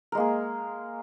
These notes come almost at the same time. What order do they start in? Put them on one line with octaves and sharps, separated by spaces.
A#4 G#3 A#3 G#4